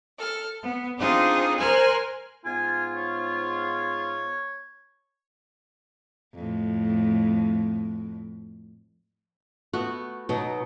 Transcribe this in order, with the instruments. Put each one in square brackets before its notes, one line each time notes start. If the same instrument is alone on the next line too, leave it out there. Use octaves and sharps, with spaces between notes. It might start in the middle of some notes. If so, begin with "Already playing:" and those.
[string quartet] A4 F6
B3
C4 D4 D#4 F4 G#4
A#4 C5 G#5 F6 F#6
[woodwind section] G#2 B3 F4 [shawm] G#5
[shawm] C#5
[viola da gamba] F2 A2
[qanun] A3 B3 [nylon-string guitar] F#4
[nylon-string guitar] B2 [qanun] F#3 D#4